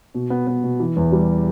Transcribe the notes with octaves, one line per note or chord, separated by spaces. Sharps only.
B2
B3
B3
B2
E3
E2
G3